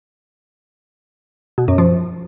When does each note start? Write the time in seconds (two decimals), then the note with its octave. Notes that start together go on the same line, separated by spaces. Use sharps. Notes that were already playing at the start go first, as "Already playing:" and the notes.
1.58 B2
1.68 F#2
1.78 F3